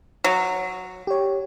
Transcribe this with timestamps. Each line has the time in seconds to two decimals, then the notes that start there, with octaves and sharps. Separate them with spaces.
0.24 F#3
1.07 G4 C#5